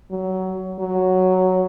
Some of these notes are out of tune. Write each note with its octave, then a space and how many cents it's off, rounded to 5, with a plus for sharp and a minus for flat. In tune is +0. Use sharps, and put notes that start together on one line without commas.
F#3 +20
F#3 +0